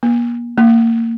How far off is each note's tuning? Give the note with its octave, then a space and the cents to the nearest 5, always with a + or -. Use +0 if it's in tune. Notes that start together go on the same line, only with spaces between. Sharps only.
A#3 +35
A#3 -25